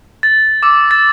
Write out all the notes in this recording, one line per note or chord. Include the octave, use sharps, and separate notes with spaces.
A6
D6 E6
A6